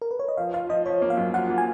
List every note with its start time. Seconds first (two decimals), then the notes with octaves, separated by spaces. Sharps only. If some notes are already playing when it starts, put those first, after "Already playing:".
0.02 A#4
0.11 B4
0.19 C#5
0.28 D#5
0.37 F3 F5
0.54 F4 F5
0.69 F3 D#5
0.86 F3 C#5
1.02 A#3
1.10 F5
1.17 F#2
1.34 F4 F#5
1.50 A#3
1.58 G#5